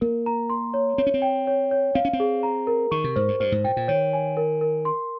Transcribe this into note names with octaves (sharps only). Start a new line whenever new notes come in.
A#3 A#4
A#5
C6
C#5
C4 C#5
C#4
C4
G5
C#5
C#5
C4 F5
C#4
C4
G#4
A#5
A#4
D#3 C#6
C3
G#2 C5
G2
G2 C5
G#2
A#2 G5
A#2
D#3 C#5
G#5
A#4
A#4
C6